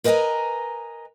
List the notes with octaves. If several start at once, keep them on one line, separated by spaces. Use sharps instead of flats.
A#4 B4 D#5 G5 G#5 A#5